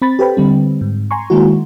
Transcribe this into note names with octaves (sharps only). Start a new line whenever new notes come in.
C4 B5 A6
G4 A4 B4 C5 G5 B5
D3 G3 C4
G#2
G#5 A#5 C6 C#6
D#3 G#3 A#3 E4 F#4